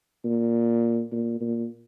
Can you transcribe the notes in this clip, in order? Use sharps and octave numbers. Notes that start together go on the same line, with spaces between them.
A#2
A#2
A#2